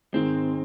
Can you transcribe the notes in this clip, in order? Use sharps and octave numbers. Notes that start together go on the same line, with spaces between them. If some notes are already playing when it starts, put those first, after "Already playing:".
G#2 D#3 G#3 C4